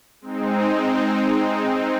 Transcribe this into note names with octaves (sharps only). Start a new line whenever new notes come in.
G#3 C4 D#4